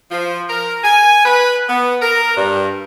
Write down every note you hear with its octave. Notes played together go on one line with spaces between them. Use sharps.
F3
A#4
G#5
B4
B3
A#4
G2